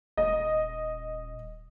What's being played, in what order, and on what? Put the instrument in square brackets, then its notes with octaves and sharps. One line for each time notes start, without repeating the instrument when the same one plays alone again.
[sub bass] D#1 [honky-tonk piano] D#5